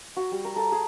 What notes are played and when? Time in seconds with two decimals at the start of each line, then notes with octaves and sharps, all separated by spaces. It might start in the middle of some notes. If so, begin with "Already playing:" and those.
0.17 F#4
0.32 G3
0.45 A#4
0.56 A4
0.72 G#4